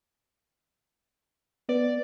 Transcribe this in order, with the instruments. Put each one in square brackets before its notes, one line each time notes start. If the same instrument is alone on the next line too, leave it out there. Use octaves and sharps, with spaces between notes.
[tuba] B3 [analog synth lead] D5